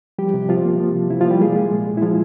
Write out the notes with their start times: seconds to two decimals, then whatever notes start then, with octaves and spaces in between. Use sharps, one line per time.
0.19 F3 G3 G4
0.34 C3
0.49 C3 F3 F4
0.64 A#3
0.80 F3
0.95 C3
1.10 C3 E4
1.21 F3 F4
1.26 G3 A#3 G4
1.41 G#3 G#4
1.56 G#3
1.71 A#2
1.87 A#2
1.97 E4
2.02 F3 G#3 F4